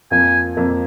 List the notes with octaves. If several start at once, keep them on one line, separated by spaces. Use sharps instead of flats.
F2 F3 A#3 G#5
F2 F3 A#3